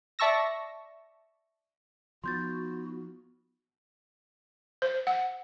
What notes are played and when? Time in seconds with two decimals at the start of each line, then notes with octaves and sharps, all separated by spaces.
0.19 D5 E5 A5 C#6 E6 A#6
2.24 F3 B3 D#4 F4 F#4 C6 G6 A6
4.82 C5
5.07 F#5